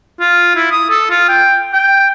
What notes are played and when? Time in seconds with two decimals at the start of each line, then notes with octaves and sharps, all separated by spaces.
0.20 F4
0.56 E4
0.72 D#6
0.91 A4
1.10 F4
1.29 G5
1.74 G5